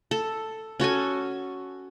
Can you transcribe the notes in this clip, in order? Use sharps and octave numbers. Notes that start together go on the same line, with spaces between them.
A4
C#4 F#4 A4 G#5